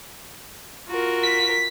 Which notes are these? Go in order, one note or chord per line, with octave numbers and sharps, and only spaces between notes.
F4 F#4 A#4
B6